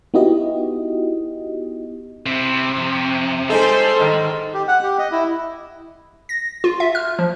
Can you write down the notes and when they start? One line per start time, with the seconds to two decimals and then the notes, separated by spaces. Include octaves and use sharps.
0.14 B3 D#4 E4 F#4 G4 D#5
2.26 C3 C4 E4
2.77 F2 F3
3.49 G3 G#3 D#4 G#4 A4 C5 C6
4.00 G#2 D#3 G#3
4.54 G4
4.68 F#5
4.83 G4
4.99 D#5
5.12 E4
6.29 A#6
6.64 F4
6.80 E5
6.95 F6
7.19 F3